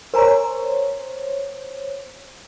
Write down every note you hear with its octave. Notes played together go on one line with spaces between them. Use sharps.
A#4 C5 C#5 G#5 A#5